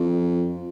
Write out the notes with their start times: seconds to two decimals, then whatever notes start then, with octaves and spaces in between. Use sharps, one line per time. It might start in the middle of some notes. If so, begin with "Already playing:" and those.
Already playing: F2